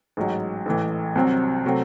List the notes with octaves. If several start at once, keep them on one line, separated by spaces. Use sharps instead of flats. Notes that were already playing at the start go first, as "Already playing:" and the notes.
A1 G#2 F#3
A1 A2 E3
C2 C3 F#3 C4
C3 F#3 A3 C4